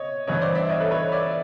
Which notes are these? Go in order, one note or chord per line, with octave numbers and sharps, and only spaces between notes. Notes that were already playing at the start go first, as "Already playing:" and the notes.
Already playing: C#5 D#5
G2 E3 C#5 D#5
C5 D5
D5 E5
C#5 D#5
A4 B4
B4 C#5
D5 E5